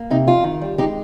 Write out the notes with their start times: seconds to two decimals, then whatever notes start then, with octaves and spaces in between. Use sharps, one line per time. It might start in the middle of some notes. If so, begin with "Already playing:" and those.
Already playing: A#3
0.10 C3 D#4
0.27 F2 F4
0.44 D#3
0.62 G3
0.78 G#3 D#4 G4